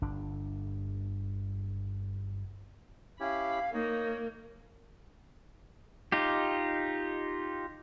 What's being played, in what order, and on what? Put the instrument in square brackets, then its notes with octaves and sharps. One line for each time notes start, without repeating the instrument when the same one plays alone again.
[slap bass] G1 D3 D4
[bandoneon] C#4 E4 G4 [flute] F5 [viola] B5
[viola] A#3 [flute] D#4 [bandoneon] C#5
[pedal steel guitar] D#4 F4 G4